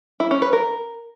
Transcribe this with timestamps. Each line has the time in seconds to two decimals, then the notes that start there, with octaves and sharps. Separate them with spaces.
0.20 E4
0.31 C#4
0.42 B4
0.53 A#4